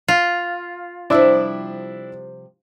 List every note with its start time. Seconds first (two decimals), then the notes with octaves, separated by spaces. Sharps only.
0.08 F4
1.10 C3 F3 G3 D4 E4 E5